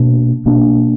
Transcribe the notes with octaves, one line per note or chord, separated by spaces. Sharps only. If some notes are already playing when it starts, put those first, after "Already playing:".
Already playing: B2 A#3 D4
B2 A#3 D4